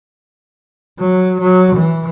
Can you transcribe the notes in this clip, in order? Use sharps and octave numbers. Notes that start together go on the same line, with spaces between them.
F#3
F#3
E3